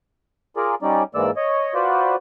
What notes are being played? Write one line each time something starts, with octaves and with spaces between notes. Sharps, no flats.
F4 G#4 A#4 D5
G3 C#4 D#4 D5
G#2 E3 G#3 A#3 D5 E6
C#5 D#5
F4 F#4 B4 C5 D5